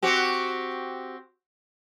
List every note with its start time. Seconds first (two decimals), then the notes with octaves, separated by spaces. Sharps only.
0.03 C4 F#4 G4